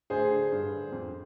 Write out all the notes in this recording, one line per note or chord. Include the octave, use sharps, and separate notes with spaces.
D2 G#4 C5
D3
G2
D3
F2